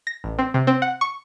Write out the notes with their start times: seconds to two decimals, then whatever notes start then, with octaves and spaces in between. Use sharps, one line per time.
0.07 A#6
0.24 A1
0.39 C4
0.54 C3
0.67 C4
0.82 F#5
1.01 C#6